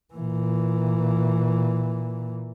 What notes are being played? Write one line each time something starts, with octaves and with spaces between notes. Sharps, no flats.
A#2 E3